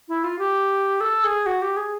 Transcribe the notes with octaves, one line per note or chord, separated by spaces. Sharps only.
E4
F4
G4
A4
G#4
F#4
G4
G#4